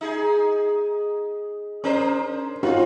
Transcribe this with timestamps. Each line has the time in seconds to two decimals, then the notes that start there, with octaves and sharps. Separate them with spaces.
0.01 D#4 G#4
1.84 C#4 D4 A#4 C5
2.63 C4 D#4 F4 F#4